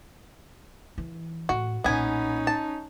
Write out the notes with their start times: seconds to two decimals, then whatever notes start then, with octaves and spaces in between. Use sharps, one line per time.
0.98 E3
1.49 A2 F#4
1.84 B1 A#2 B3 C#4 D#4 G#5
2.47 A5